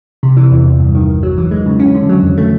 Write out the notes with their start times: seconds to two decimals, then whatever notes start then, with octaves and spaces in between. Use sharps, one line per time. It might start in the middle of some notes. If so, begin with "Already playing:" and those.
0.23 C3
0.37 E3
0.51 E2
0.66 E2
0.79 G2
0.95 D#3
1.09 G#1
1.23 F#3
1.38 E3
1.51 G#3
1.66 C#3
1.80 C#4
1.94 D3
2.09 F#3
2.23 F2
2.38 A3